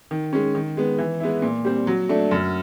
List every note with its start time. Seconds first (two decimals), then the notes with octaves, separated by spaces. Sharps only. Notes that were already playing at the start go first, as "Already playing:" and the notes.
0.11 D#3
0.33 G#3 C#4
0.55 D#3
0.77 G#3 B3
0.99 E3
1.20 G#3 B3 E4
1.42 A#2
1.65 G3 C4
1.87 F#3
2.09 A3 D4
2.31 F#2